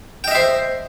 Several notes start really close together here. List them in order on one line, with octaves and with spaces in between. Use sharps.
G5 D#5 E5 C5